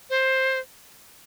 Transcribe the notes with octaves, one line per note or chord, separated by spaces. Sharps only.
C5